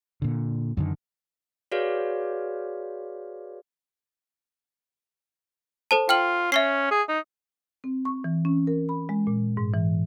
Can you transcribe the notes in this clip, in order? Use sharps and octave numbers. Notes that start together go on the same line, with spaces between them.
A#2 D3
F#2 D3 D#3
F#4 G#4 B4 C#5 D5 F5
A4 C5 A5
F4 G5 F6 F#7
C#4 E5 C#6 C7
G#4
D#4
C4
C#6
E3
C#4
A#4
B5
G#3
A#2
G#2
E3